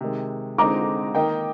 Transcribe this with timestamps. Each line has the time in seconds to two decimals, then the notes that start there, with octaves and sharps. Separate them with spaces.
0.01 C3 D#3 G#3
0.58 D3 G#3 C4 D#4 A#5 D6
1.15 D#3 A#3 D#4 G5